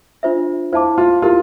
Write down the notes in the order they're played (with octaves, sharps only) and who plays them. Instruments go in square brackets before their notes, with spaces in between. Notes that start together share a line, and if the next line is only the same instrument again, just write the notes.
[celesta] D4 F4 C5 E5
[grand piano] E4 [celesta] C5 F5 A5 D6
[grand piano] F4
[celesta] E4 G4 A#4 [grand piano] F4